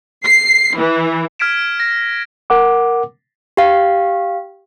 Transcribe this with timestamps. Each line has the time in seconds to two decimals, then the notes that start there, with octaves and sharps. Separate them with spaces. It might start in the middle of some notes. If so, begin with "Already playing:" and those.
0.25 C7
0.78 E3
1.39 F6 G#6 B6 D7 E7
1.80 A#6
2.50 A#4 F#5 D6
3.57 G4 F5